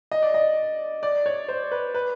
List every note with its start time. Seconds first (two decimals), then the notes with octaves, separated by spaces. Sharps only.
0.12 D#5
0.22 D5
0.34 D#5
1.03 D5
1.26 C#5
1.48 C5
1.71 B4
1.94 B4